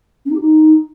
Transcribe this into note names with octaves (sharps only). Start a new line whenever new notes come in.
C#4
D#4
G4
D#4